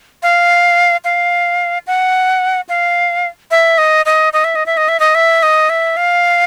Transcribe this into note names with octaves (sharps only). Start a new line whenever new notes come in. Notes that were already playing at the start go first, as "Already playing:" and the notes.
F5
F5
F#5
F5
E5
D#5
D#5
D#5
E5
D#5
E5
D#5
E5
D#5
E5
D#5
E5
F5